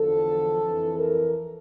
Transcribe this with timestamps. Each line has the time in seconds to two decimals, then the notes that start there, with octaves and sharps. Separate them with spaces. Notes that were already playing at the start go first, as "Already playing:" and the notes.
Already playing: E2 D3 F3 A4
0.63 F2 E3
0.99 A#4